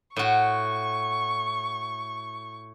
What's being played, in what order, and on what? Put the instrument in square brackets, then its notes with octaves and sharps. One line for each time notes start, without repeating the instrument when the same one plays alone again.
[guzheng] A2 F#4 [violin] C#6